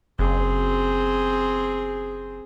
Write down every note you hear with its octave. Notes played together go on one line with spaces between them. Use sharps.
F#1 C4 G#4